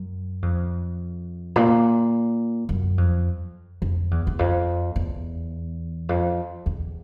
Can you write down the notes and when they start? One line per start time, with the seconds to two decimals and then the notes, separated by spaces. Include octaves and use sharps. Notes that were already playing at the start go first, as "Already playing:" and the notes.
Already playing: F#2
0.42 F2
1.56 A#2
2.69 F#2
2.98 F2
3.82 F2
4.11 E2
4.27 E2
4.39 F2
4.96 E2
6.09 F2
6.66 E2